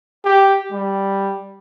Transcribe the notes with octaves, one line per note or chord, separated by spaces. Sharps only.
G4
G3